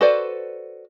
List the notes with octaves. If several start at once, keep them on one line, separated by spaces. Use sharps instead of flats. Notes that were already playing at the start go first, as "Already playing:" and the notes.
F#4 A4 B4 C5 D5